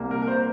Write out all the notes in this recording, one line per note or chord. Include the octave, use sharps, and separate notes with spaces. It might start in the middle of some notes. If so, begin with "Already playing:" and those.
Already playing: C2 C3 A#3
A#4
A#4
C5